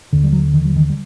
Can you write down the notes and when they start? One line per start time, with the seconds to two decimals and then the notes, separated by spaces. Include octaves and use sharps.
0.13 D#2 D3
0.24 G3
0.33 F#3
0.54 D#3
0.65 F#3
0.76 D#3
0.89 G3